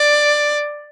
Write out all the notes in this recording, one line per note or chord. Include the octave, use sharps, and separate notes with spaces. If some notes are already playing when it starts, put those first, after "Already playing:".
Already playing: D5